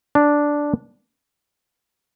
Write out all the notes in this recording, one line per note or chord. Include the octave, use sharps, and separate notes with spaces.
D4